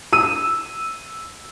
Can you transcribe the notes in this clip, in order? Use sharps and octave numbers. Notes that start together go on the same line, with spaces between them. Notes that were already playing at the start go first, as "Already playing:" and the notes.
E6 D#7